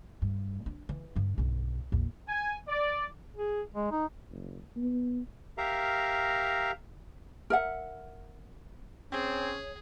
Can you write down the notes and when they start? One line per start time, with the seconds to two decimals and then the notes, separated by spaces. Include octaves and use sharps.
0.22 G2
0.66 D4
0.89 E3
1.16 G2 D4
1.38 B1 G2
1.92 A#1 E2
2.28 G#5
2.68 D5
3.36 G#4
3.74 G#3
3.91 D#4
4.30 F#1
4.76 B3
5.58 G4 A#4 E5 F5 A#5
7.50 A#4 E5 F#5
9.12 C4 C#4 G#4 C#5